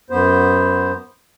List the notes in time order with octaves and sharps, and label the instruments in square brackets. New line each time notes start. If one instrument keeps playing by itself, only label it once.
[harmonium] F#2 B3 C5